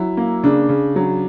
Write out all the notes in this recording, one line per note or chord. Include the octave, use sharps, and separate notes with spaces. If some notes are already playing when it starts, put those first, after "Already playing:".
Already playing: F#3 E4
A#3
C#3 D4
C#3
F#3